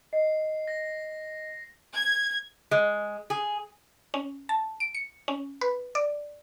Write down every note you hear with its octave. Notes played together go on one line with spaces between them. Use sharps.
D#5 C7
A#6
G#6
G#3
G#4
C#4
A5
D7
C#7
C#4
B4
D5